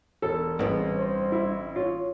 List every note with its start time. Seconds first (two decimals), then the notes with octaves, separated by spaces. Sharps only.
0.22 E1 A4
0.59 A1 G2 B3 C4 G#4
0.98 C5
1.32 E4
1.76 F4 C#5